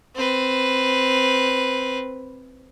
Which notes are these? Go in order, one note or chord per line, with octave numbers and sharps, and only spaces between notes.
C4 B4